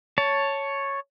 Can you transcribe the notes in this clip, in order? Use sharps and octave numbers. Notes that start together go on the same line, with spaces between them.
C#5 A5